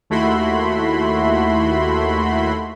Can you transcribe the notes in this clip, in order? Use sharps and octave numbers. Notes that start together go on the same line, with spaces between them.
D#2 A3 E4 F#4 B5 C6